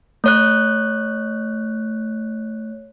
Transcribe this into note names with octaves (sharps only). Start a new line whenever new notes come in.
A3 C#5 F#6